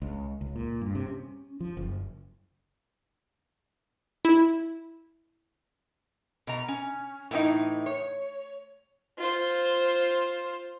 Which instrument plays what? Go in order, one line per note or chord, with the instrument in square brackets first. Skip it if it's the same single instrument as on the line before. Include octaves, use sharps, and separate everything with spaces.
[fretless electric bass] C#2
C#2
A#2
G2
C3
C#4
F3
F#1
[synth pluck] E4
[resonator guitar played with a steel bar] B2 A#5
C#4
A2 E3 G#3 B3 D#4 E4
C#5
[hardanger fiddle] F4 C5